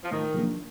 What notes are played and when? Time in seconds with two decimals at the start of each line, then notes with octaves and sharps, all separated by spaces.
0.04 F3
0.11 A2 D#3
0.34 F3 A#3 D4